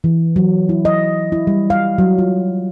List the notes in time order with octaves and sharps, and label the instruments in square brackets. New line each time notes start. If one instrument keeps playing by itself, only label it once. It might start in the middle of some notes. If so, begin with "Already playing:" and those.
[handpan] E3
F#3
E4
D#5
E4
G3
F5
F#3
F4